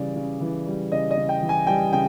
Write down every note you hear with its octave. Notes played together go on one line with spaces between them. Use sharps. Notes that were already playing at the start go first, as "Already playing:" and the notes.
Already playing: C#3 E3 G3 D5
C#3
E3
G3
C#3 D#5
D#5
C#3
G5
E3
G#5
G3 G5
C#3 G5